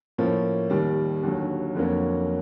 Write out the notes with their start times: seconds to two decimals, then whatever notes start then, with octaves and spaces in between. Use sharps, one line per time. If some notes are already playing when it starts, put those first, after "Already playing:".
0.18 A2 F3 A#3 C#4
0.70 D#2 D#3 G3
1.23 D#2 D3 F#3
1.75 F2 D3 F#3 A#3 C#4